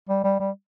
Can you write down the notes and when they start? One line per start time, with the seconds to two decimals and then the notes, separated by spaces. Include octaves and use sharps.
0.09 G3
0.24 G3
0.40 G3